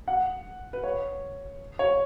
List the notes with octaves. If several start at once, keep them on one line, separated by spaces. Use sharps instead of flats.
F#5
B4
C#5
C#5